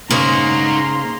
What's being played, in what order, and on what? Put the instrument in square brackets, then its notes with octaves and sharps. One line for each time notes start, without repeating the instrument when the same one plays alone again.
[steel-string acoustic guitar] C#3 A#3 [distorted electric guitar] D#4 C5 [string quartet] A#5 C6